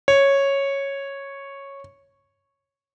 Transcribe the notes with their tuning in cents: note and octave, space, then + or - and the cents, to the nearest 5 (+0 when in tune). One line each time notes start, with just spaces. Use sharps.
C#5 -5